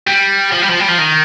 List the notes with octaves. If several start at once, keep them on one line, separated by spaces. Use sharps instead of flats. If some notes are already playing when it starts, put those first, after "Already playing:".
G3
F3
G3
F3
G3
F3
D#3